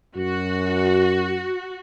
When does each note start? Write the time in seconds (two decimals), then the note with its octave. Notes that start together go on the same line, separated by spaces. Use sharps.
0.17 F#2 F#4